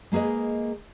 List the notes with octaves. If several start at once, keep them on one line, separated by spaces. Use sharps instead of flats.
G#3 A#3 G#4 B4 D#5